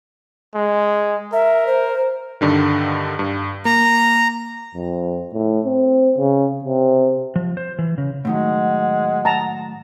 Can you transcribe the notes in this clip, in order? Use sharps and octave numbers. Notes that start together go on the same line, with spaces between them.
G#3
A#4 E5
C5
G2 D3 D#3
G2
A#3 A#5
F2
A2
C4
C#3
C3
F3
C5
E3
C#3
A2 D#3 F#3 G#3 F#5
A5 A#5